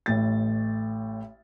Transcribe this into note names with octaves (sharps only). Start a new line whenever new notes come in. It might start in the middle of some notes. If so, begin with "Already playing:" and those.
A1 A2 A6